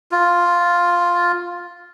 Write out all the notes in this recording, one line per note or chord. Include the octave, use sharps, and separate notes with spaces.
F4